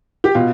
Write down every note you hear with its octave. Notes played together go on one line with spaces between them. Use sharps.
G4
B2 F4